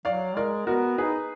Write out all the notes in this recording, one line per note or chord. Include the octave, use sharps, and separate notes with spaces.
F#3 D5 F5
G#3 A#4 D5
B3 F#4 A#4
D#4 G#4 B4